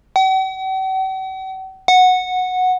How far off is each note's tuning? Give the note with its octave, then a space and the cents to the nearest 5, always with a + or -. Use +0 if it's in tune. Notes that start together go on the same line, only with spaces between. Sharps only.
F#5 +45
F#5 -10